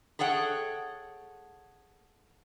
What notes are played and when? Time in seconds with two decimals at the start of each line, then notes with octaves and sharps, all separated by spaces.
0.19 G#4 A4 C#5 F#5 G5